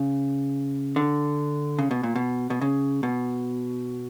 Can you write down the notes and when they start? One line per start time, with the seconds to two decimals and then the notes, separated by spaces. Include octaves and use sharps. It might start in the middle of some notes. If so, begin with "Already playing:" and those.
Already playing: C#3
0.96 D3
1.79 C#3
1.91 B2
2.03 A#2
2.16 B2
2.50 B2
2.61 C#3
3.03 B2